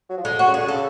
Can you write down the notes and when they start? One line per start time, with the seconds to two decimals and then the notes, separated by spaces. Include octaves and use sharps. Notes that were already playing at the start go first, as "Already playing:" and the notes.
0.10 F#3
0.17 F3
0.24 D3 G#3
0.39 F#4
0.47 C#3
0.54 D3 G#4
0.67 C#3 A4